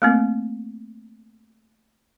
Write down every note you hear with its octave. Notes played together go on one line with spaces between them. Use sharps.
A3 A#3 C4